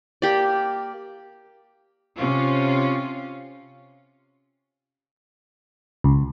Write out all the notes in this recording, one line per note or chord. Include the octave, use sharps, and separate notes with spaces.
A#3 G4 D5
C3 C#4 F4
C#2